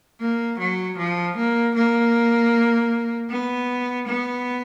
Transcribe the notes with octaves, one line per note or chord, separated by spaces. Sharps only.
A#3
F#3
F3
A#3
A#3
B3
B3